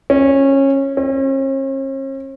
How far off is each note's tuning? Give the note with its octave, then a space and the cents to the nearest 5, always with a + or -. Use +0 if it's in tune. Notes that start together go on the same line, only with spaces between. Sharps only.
C#4 -20
C#4 -45